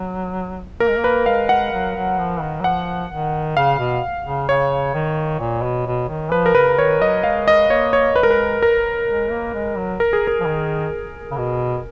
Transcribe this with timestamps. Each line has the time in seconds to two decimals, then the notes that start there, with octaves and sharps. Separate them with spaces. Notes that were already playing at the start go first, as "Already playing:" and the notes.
Already playing: F#3
0.80 A#3 A#4
0.89 G#3
0.97 A#3
1.04 B4
1.26 G#3 F5
1.49 F#5
1.72 F#3
1.96 F#3
2.18 F3
2.41 D#3
2.60 F#3
2.64 F3 F#5
3.10 D#3
3.57 C#3 F5
3.79 B2
4.25 C#3
4.49 C#3 C#5
4.94 D#3
5.40 A#2
5.63 B2
5.86 B2
6.09 D#3
6.32 F3 B4
6.46 A#4
6.55 C#3 B4
6.78 D#3 C#5
7.01 F#3 D#5
7.23 G#3 F5
7.48 D#5
7.69 A#3 C#5
7.93 C#5
8.16 G#3 B4
8.23 A#4
8.30 B4
8.62 A#4
9.08 G#3
9.31 A#3
9.54 G#3
9.77 F#3
10.00 A#4
10.13 G#4
10.27 A#4
10.40 F3
10.46 D#3
11.31 C#3
11.38 B2